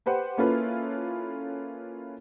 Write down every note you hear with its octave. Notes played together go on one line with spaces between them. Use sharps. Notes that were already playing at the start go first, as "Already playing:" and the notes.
G4 B4 C5 F#5
A#3 C#4 E4 F4 A4 B4